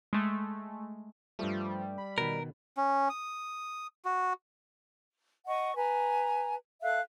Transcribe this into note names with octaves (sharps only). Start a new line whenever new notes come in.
G#3 A3
G2 F3 G3 A3
B5
B2 D#3 A#4
C#4
D#6
F#4
D#5 F#5 C#6
B4 G#5 A#5
A4 E5 F5 F#6